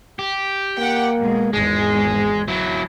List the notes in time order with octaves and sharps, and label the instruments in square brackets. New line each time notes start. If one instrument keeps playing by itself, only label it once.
[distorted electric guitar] G4
[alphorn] A#3 [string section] F#5 G5
[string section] B2 G#3
[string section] G#1 E2 G#2 [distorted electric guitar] G#3 [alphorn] G#4
[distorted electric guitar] F#3 E4